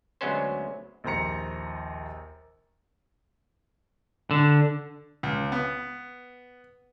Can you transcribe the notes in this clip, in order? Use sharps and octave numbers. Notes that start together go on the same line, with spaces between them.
D2 F#3 G#3 B3 C#4 C5
A#1 D#2 C5 A#5 C#7
D3
C#2
B3